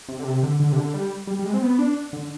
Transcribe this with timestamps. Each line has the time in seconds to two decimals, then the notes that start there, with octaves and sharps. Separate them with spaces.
0.09 C3
0.19 D3
0.25 C3
0.43 D3
0.60 D3
0.72 C3
0.77 D3
0.94 G3
1.27 G3
1.39 G3
1.45 G#3
1.54 C4
1.62 B3
1.79 D4
2.13 D3